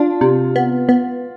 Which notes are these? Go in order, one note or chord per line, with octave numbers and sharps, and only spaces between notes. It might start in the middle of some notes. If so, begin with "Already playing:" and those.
Already playing: D4 F4
C3
B3
B3